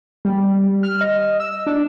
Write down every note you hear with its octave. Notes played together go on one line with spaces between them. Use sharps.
G3
F6
D#5
E6
D4